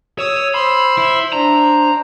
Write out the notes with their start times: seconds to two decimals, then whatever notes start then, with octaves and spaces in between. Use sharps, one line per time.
0.19 C#5 D#6 E6
0.54 C5 B5 C6 E6
0.98 E4
1.33 D4 C5 A#5